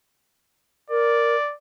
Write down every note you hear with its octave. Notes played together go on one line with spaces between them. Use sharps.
A#4 D5